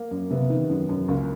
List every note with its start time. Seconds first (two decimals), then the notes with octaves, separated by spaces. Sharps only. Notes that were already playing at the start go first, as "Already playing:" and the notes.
Already playing: A#3
0.11 F#2
0.31 C3 B3
0.50 D#3
0.70 F#2
0.89 F#2
1.08 C#2 A#3